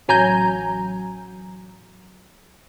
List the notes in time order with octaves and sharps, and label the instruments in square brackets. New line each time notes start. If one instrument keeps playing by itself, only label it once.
[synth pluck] A1 F#3 G#5 A#5 G6